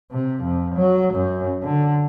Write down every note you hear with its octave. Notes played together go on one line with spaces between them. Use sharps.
C3
F2
F#3
F#2
D3